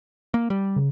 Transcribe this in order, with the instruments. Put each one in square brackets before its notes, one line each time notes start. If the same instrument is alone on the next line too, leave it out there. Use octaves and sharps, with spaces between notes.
[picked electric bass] A#3
G3
[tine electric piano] C#3